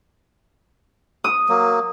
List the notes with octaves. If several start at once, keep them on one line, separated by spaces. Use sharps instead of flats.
D#6
F#3 A#3